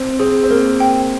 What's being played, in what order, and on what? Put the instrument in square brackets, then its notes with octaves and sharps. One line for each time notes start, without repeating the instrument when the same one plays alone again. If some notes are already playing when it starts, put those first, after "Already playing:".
Already playing: [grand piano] C4
[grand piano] C4 [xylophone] G#4
[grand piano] C4
[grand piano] A#3 [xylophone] A#4
[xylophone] G5